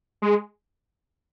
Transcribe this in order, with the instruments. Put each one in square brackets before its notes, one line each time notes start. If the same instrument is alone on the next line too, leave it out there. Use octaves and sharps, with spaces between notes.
[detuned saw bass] G#3